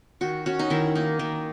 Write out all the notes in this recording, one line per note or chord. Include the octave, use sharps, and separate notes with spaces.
D#3 F#4
C#4 F#4
D#4
D#3 E4
A#3 D#4
D#3